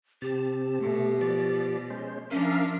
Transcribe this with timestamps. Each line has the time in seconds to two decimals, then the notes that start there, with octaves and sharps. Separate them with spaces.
0.22 C3 C4 G4 A5
0.81 B2 A3
1.21 F3 D5
1.90 G#3 C#4 C5
2.31 F3 C#4 D4 A#4 E5 F5